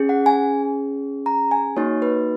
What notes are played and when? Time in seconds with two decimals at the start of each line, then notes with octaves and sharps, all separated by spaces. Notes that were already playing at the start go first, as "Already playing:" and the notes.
Already playing: C#4 G#4
0.09 F#5
0.26 G#5
1.26 A#5
1.51 G#5
1.76 A#3 D#4 F#4 C#5
2.02 B4